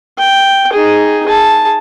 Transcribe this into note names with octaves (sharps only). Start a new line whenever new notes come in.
G5
D#4 G#4
G#4 A5